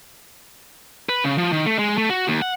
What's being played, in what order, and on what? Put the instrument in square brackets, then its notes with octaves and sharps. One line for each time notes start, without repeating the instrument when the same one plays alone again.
[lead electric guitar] B4
C#3
F3
D#3
A3
G#3
A3
F#4
D#2
F#5